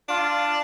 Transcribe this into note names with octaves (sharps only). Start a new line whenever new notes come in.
D4 F4